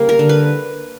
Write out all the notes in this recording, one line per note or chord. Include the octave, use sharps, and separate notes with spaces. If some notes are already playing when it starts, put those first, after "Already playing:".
Already playing: C#3 G3 A#3
A#4
D3
B4